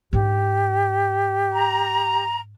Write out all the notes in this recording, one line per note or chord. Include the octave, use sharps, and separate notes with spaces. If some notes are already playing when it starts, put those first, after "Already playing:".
G#2 D4 G4
A#5